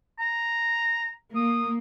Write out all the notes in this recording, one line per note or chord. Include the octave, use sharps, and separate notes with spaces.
A#5
A#3 D#6